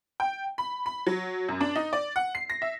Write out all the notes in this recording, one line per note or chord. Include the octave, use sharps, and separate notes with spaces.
G5
B5
B5
F#3
F#2
D4
D#4
D5
F#5
C7
A#6
E5